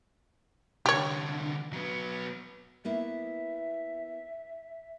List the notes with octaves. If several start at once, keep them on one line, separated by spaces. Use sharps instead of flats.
C2 D3 G4 C#5
F#3 B3
A#3 B3 E4 E5